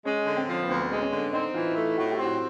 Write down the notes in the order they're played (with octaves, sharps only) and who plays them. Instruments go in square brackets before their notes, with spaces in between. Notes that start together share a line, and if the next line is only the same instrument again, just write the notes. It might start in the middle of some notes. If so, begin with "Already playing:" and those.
[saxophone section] G#3 [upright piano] C#4
[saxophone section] D3
[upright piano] C4
[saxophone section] F3
[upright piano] B3
[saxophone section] D2 [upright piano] C4
[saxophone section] G#3
[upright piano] C#4
[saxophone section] D3
[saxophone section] C4 [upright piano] D#4
[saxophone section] E3 [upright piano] F4
[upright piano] E4
[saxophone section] A3
[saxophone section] A2 [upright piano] F#4
[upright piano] G4
[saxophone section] C4
[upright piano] F#4